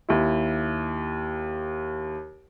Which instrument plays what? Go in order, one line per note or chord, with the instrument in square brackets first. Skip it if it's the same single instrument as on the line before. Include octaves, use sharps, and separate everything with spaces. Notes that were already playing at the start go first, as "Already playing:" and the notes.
[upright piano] D#2 E4